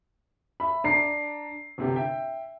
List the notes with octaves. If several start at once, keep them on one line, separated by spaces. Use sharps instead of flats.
E5 B5
D4 A#5 C7
G1 C3 G4
E5 G5